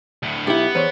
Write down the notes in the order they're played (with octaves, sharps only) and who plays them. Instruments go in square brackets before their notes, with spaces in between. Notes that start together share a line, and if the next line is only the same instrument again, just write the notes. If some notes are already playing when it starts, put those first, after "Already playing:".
[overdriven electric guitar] D2 A2
[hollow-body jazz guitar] B1 E4 [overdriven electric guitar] B3 [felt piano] G4
[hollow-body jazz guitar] E2 [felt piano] C5 C#5